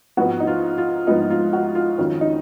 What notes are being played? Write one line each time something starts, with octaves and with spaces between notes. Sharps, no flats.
G#2 F3 G#3 B3 F#4
D#4
F4
F4
G#2 F3 G#3 B3 D#4
F4
F#4
F4
F2 D#3 F#3 C#4
D#4